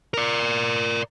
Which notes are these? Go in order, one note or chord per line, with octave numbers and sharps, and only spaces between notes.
A#4 D5